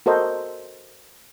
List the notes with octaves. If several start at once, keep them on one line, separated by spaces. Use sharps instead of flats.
F#4 A4 A#4 C5 D#5